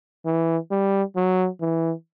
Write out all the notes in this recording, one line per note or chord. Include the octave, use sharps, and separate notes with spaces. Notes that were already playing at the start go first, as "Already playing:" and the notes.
E3
G3
F#3
E3